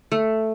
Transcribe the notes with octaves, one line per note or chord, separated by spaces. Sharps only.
A3